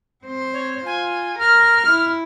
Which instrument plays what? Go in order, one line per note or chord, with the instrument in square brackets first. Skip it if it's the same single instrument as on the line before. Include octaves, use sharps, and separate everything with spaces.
[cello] C4 C5
[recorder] C#5
[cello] F4 [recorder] G#5
[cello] A#4 [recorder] F6
[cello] E4